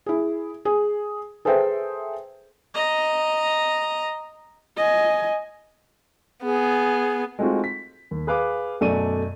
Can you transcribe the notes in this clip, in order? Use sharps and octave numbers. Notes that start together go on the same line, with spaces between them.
E4 G#4
G#4
G#4 A4 B4 C5 E5 G5
D#5 A#5
D#5 G#5
B3 G#4
G#3 A3 C4 D#4 F4 F#4
B6
D#2
G#4 B4 F5 D6
F#2 B2 A3 D5 D#7